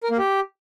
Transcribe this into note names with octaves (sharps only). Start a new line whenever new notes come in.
A#4
A#3
G4